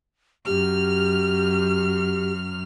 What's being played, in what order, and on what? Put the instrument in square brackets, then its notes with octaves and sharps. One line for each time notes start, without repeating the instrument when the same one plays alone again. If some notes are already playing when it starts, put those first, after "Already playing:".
[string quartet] F#2 F6 [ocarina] G4